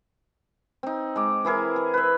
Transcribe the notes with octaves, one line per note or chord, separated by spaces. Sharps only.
C4 D#4
G#3 D6
E3 E4 G#4 A#4
G#4
B4 E5